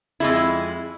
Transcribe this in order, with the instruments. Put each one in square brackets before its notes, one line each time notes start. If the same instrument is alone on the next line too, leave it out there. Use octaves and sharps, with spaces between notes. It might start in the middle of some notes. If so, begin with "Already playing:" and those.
[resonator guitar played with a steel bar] F2 G#3 E4